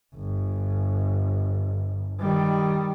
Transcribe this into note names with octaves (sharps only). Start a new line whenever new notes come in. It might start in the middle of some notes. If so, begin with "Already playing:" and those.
G1
D#3 G3